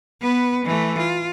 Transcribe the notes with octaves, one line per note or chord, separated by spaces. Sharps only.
B3 B4
E3 A3
F4